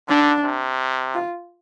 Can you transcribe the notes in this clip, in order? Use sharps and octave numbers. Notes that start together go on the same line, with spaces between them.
D3 D4
C3
F4